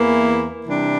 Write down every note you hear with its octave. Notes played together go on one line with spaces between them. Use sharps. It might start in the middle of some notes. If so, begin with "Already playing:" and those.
Already playing: E2 E3 A#3 E4
C3 E3 G3 D4